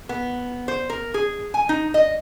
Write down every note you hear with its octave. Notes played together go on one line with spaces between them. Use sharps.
B3
C5
A#4
G#4
G#5
D#4
D#5